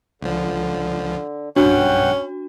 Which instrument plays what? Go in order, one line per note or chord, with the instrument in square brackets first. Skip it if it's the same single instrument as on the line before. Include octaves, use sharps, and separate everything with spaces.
[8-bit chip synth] C#2 F3 [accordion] D3
[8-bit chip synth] B1 G2 [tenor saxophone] C#4 [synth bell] D4 F#4 [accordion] F#5 G5